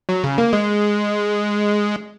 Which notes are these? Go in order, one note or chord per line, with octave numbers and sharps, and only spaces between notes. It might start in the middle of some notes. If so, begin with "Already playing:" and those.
F#3
C#3
A#3
G#3